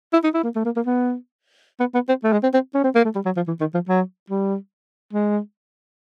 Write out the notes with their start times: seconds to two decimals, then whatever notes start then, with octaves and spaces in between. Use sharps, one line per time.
0.13 E4
0.24 D#4
0.34 E4
0.44 A#3
0.55 A3
0.65 A#3
0.76 A#3
0.86 B3
1.80 B3
1.94 B3
2.08 C4
2.24 A3
2.32 G#3
2.43 C4
2.54 C4
2.74 C#4
2.84 C4
2.95 A#3
3.05 A3
3.15 G3
3.25 F#3
3.36 F3
3.48 E3
3.60 D#3
3.74 F3
3.88 F#3
4.30 G3
5.13 G#3